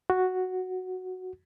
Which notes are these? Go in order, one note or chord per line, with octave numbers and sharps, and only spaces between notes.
F#4